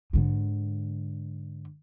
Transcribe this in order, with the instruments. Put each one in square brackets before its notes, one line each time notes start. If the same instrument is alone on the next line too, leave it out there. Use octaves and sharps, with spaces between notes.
[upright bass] G#2 D3